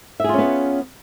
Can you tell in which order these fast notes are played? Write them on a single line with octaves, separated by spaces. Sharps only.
E5 G#4 F4 C#4 B3